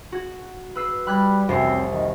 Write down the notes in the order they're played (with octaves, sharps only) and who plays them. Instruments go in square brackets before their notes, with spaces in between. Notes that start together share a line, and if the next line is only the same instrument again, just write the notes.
[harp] F#4 G#6
B4 E6 C7
[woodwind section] G3 [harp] B5 F#6 G#6
[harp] F1 C2 [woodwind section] F#2 C4 C6
[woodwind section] D#3